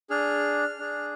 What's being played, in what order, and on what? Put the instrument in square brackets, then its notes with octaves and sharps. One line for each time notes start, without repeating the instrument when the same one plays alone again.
[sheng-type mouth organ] D4 G#4 F6
D4 G#4